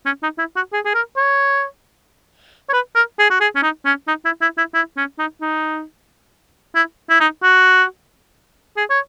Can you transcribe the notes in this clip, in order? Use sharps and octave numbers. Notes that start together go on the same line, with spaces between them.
C#4
D#4
E4
F#4
G#4
G#4
A#4
C#5
C#5
B4
A#4
G#4
F#4
G#4
C#4
D#4
C#4
D#4
E4
E4
E4
E4
C#4
D#4
D#4
E4
E4
D#4
F#4
G#4
C#5